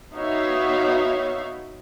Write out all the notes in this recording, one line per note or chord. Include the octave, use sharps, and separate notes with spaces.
B3 D#4 F#4 C#5 E5 F5